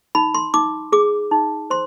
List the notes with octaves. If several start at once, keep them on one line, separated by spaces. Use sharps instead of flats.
D#4 B5
C6
D#4 D6
G#4 D6
D#4
C5 C6